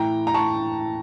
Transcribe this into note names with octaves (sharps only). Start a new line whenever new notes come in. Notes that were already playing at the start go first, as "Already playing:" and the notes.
Already playing: A2 E3 G5 A#5
A#5
A5 C#6